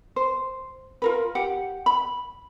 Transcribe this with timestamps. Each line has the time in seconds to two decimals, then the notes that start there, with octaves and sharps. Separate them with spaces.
0.16 C5
1.02 F4 A#4 B4
1.35 G4 F#5
1.86 B5